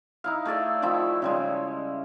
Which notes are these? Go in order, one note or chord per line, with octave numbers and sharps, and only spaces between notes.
D#4 E4 F5
A3 G#4 D5 E5
D#3 F3 E4 E5
C#3 G3 G#3